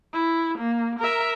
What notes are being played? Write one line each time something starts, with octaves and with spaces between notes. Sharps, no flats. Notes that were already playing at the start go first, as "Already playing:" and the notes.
E4
A#3
A#4 E5